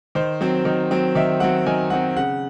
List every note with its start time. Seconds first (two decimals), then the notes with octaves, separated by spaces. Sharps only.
0.15 D#3 C5
0.41 F#3 C4
0.65 D#3
0.91 F#3 C4
1.15 D#3 E5
1.40 F#3 C4 F#5
1.66 D#3 G#5
1.90 F#3 C4 F#5
2.16 C#3 F#5